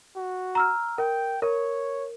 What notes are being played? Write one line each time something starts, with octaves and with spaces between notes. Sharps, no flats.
F#4
A#5 E6 F6
A#4 G5
A#4 C#5